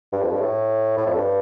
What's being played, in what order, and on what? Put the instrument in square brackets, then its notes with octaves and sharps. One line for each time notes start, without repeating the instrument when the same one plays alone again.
[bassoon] G2
F2
G2
A2
A2
F2
G2